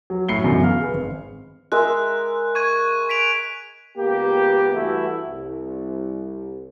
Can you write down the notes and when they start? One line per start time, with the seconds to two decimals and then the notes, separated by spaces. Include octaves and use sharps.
0.10 F#3
0.29 F#2 A2 C7 C#7 G7
0.43 F#2 B2 D3 E3 B3
0.63 F5 F6
0.79 G#4 B4
0.94 G#1
1.72 G#3 A#4 E5 F#6
2.55 C#6 G#6 D#7
3.09 B6 D7 F7
3.98 C#2 A#3 B3 G4
4.73 G2 E3 A3 E4 F#4
5.26 C2